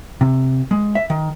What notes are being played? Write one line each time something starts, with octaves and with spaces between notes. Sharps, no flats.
C3
G#3
E5
D#3